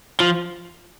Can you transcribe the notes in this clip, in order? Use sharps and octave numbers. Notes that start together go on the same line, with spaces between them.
F3